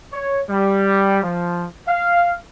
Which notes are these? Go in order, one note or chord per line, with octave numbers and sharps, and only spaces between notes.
C#5
G3
F3
F5